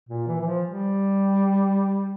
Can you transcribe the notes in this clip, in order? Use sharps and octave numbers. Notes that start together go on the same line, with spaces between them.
A#2
E3
E3
F3
G3